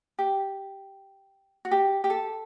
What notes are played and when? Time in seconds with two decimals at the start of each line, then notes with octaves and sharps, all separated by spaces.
0.19 G4
1.65 F#4
1.71 G4
2.04 G4
2.10 A4